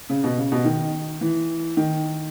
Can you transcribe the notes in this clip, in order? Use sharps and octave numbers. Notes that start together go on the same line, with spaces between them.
C#3
B2
C#3
B2
D#3
E3
D#3